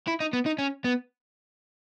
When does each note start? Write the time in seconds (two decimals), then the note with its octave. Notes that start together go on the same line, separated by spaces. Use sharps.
0.08 E4
0.21 D#4
0.33 B3
0.46 D#4
0.58 C#4
0.84 B3